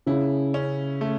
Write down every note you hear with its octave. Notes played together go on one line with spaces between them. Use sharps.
C#3 E4
C#4
A3